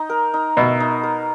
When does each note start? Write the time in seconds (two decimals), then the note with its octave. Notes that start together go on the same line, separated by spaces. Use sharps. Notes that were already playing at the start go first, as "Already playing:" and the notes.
Already playing: D#4
0.10 A#4
0.34 D#4
0.57 B2 E5
0.80 D#4
1.04 A#4